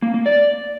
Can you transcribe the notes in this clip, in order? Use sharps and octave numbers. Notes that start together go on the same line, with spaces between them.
A#3
A#3
D5